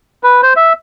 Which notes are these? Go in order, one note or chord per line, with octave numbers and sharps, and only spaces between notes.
B4
C5
E5